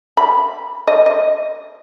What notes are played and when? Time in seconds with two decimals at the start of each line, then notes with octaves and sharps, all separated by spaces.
0.17 B5
0.87 D#5
1.06 D#5